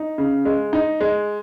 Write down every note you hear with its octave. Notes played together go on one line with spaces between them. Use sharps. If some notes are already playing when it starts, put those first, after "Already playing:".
Already playing: D#4
C#3
G#3
D#4
G#3